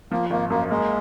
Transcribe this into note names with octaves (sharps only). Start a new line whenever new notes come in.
F3 A#3
G#1 A#3
F#2 A#3
G#3 A#3